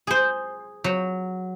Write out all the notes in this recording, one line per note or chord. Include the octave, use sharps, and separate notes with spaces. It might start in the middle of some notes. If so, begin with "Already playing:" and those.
G#4 C5
F#3